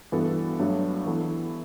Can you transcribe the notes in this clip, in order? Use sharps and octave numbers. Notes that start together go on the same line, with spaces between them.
G2 E3 B3 F#4 A4
G2 F#3 A3 D4
E3 B3 E4 A4